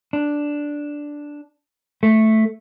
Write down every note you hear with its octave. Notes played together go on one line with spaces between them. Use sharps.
D4
A3